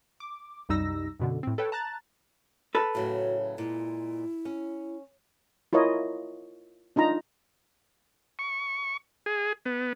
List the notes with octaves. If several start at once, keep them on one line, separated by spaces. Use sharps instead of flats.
D6
C2 F#2 G3 D#4 E6 A#6
F#2 B2 D3
A2 C4
A4 B4 C#5 G5
A5 A#5 F#6 A6
A4 B4
A2 C#3 F#3 F#4
A#2 G#3 E4
C#4
E4 F4 A#4 C#5 D#5
D4 D#4 F4 A#5
C#6
G#4
B3